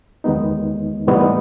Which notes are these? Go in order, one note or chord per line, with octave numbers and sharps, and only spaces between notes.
D#2 D#3 G#3 B3 D#4
A2 E3 G3 B3 D#4